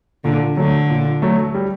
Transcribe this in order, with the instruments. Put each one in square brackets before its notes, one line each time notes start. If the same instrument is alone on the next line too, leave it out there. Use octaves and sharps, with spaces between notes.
[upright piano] A#2 [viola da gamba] D3
[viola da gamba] D3 [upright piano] F#3 A3
[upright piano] A#2
F#3 A3
G3